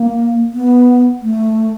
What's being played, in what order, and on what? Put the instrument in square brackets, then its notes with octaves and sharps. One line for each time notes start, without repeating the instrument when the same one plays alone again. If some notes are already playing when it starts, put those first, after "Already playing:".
Already playing: [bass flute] A#3
B3
A3